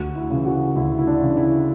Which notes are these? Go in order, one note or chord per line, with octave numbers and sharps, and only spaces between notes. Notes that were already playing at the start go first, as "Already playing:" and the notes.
Already playing: D2 F#4
E4
C#3 E3
F#4
D2 E4
E4
D4
C#3 E3
E4